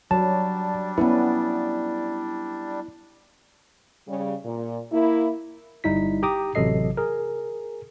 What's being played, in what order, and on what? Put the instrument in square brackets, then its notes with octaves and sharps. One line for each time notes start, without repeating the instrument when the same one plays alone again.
[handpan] F#3 [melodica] G3 D4 [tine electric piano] A5
[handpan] B3 C#4 B4 [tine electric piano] E4
[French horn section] C#3 G3
A#2
A#3 E4
[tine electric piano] G1 G3 D#4 E4 B6
G4 G5 A#5 D6 D#6
A1 C3 F#3 A4 D#5 C7
G#4 A#4